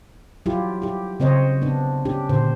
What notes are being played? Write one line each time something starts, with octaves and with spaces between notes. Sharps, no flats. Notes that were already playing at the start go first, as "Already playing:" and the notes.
F#3 E4 F4 G4
E4 G4
C#3 C4 C5 C#5 D#5
B3 D4
C#4 D4 G4
A#2 D3 C5